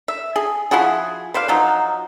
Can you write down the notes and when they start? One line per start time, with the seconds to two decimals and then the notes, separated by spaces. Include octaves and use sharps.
0.08 E5
0.36 G#4
0.71 F3 E4 F#4 G#4
1.34 B4 C5 D5 F5
1.48 F3 F#3 D#4